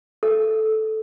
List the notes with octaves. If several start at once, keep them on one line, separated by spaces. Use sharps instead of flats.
A4